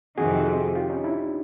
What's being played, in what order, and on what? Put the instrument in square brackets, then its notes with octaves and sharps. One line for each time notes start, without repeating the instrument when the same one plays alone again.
[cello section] F2 C3 D#3 [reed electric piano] F#4 G#4
[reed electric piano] F4 G4
C#4 D#4
D4 E4